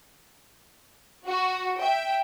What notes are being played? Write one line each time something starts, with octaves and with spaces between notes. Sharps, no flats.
F#4
E5 G5